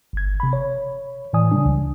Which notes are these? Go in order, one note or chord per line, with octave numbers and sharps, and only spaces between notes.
G1 G#6
C3 B5
C#5
A2 E3 D5 G#5 D#6
C#3 G3 D4
C#2